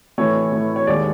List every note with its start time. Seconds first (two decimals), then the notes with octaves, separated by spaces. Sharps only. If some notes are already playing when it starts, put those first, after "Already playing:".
0.18 A2 E3 A3 C#5
0.52 A2 E3 A3
0.76 C#5
0.87 D#2 D#3 G#3 D5